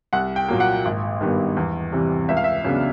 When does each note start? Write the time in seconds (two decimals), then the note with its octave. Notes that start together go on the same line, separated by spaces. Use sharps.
0.13 C2 F#5
0.36 G5
0.49 A#2 F#3 A#3
0.60 F#5
0.85 G#1
1.21 G2 D#3 G3 B3
1.57 E2
1.92 C3 E3 G3 C4
2.29 C#2 E5
2.37 F5
2.44 E5
2.64 C#3 F#3 B3 D4